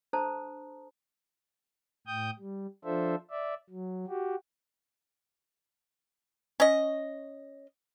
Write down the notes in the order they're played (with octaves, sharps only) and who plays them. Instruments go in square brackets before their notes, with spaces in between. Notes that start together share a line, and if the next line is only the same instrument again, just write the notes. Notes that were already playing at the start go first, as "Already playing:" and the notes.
[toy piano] D4 A4 C5 A5 A#5 D#6
[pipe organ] A2 G5 D#6 G6
G3
F3 D4 F4 A4 C5 E5
D5 E5
F#3
F#4 G4
[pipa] C#4 D#5